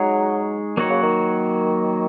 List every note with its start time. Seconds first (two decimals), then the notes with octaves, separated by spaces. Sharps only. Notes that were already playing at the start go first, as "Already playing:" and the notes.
Already playing: F#3 G#3 D#4 G#4 C#5
0.77 D#3 F#3 A#3 F#4 C#5
0.90 C#3
1.03 D#3